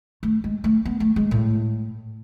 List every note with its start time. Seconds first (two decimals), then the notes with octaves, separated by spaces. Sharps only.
0.23 A3
0.44 G#3
0.64 A3
0.85 B3
1.00 A3
1.16 G#3
1.31 A2